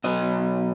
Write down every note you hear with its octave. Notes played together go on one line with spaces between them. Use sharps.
B2 F#3 D#5